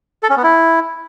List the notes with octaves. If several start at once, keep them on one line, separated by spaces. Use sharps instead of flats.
A4
C#4
B3
E4